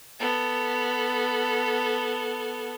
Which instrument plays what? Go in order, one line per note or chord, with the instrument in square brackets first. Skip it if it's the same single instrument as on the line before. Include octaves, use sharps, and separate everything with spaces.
[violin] B3 A4